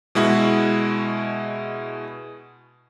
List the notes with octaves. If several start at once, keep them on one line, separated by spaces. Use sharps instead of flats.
B2 G#3 E4 F#4